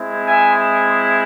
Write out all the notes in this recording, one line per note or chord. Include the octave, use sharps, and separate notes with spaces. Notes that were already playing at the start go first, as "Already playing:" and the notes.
Already playing: G#3 C4 E4
E5 G#5